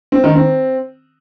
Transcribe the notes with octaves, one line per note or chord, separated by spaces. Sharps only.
C4
D#3
C4